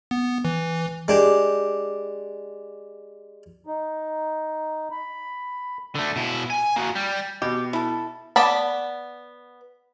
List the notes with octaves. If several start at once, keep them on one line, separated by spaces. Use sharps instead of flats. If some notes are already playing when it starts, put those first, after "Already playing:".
B3
E3
G#3 D4 G4
D#4
B5
D3 A3
B2 E4
G#5
A#3 F#4
G3
B2 G4
E4 A4
B3 D5 A5 B5